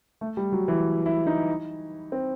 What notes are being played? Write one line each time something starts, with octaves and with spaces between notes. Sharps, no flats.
A3
G3
F#3
E3
E4
D#4
C4